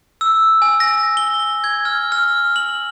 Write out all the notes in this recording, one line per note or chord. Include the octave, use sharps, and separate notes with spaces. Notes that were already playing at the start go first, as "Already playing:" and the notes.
E6
G#5
A#6
G7
G#6
F6
F6
F#7